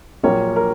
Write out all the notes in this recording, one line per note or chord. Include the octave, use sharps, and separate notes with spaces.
A#1 A#2 F#3 A#4 C#5
A#4